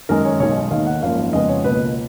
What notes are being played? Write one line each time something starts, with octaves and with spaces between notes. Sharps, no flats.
F#2 D#3 G#3 A#4
C#5
B1 B2 G#3 C#5
D#2 D#3 A#3 F5
F#5
G#1 F#2 F3 A#3 F5
F2 C#3 G#3 B3 D#5
C#5
C#2 B2 A#3 B4